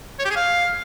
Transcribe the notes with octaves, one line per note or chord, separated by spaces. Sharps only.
C#5
G4
G#4
F5